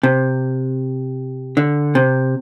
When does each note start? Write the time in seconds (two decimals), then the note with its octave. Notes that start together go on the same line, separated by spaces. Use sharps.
0.03 C3
1.57 D3
1.95 C3